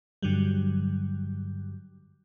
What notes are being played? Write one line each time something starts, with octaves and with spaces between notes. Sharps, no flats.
G2 D3 F#3 G3